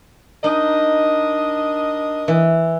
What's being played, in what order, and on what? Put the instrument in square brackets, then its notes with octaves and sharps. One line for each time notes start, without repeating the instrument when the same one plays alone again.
[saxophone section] D4 A#4 D#5 [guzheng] D#4
[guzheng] E3